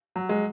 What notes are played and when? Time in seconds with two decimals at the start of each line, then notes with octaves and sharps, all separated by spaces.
0.16 F#3
0.29 G#3